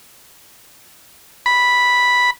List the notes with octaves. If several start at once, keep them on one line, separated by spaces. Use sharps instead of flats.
B5